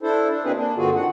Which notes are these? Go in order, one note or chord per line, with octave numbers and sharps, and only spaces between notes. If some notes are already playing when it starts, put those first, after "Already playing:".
D4 E4 A4 C5
D4
B2 A#3 C4 D4 G#4 B4
A#3 D4
G2 D3 C4 F4 F#4 G#4
D#3 F#5